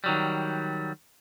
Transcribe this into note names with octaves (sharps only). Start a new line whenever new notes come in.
D#3 F#3 G3